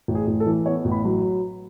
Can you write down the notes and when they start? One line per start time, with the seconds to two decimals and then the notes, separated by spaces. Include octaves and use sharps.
0.08 A1
0.15 G#4
0.27 A1
0.40 A4
0.46 E3
0.66 B3 C#5
0.85 A1
0.92 B5
1.05 F#3